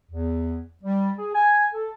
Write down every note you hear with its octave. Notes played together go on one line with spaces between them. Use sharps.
E2
G3
G#4
G#5
A4